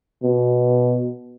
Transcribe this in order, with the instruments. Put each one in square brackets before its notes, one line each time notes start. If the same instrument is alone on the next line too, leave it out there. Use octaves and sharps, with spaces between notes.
[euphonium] B2